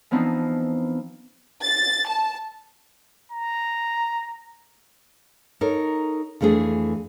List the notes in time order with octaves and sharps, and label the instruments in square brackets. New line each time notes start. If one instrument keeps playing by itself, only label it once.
[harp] E3 F3 B3 C4 D4 D#4
[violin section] A6
A5
[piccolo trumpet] A#5
[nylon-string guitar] D#4 A4 A#4 C#5
F2 E3 A3 D4 G#4